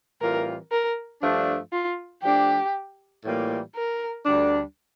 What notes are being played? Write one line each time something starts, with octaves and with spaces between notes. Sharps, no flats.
A2 E3 G3 C4 F4 A#4
A#4
G2 F3 A3 D4
F4
F3 A3 D4 G4
A2 E3 G3 A#3 F4
A#4
D2 D3 G3 D4